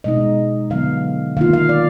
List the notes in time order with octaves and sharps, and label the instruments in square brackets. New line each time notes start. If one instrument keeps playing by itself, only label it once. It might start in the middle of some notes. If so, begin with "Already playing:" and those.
[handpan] B2 G#3 D#4 D#5
D3 F#3 B3 F5
D#3 A#3 F4 F5
F5
D5